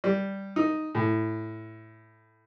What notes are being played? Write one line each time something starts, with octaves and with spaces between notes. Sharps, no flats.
G3
D#4
A2